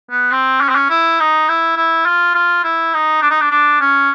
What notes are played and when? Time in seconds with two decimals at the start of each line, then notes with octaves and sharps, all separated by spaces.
0.11 B3
0.32 C4
0.61 C#4
0.69 C4
0.75 C#4
0.90 E4
1.20 D#4
1.49 E4
1.77 E4
2.06 F4
2.35 F4
2.64 E4
2.94 D#4
3.22 D4
3.31 D#4
3.41 D4
3.51 D4
3.81 C#4